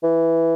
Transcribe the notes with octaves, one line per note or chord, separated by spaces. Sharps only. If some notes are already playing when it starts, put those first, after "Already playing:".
E3